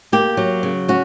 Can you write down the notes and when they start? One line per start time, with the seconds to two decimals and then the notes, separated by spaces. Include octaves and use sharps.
0.12 A#3 G4
0.37 F#3
0.63 C#3
0.88 C#4 F#4